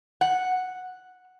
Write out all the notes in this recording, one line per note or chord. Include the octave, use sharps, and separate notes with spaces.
F#5